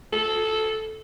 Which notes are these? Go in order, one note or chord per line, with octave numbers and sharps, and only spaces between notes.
A4